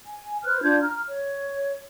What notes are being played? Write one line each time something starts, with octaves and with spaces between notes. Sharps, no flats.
G#5
B4 C5 F6 F#6
D4 F4 G6 G#6
A#5 F6
C#5